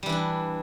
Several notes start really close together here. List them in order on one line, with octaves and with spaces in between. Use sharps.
G3 E3 D4 E4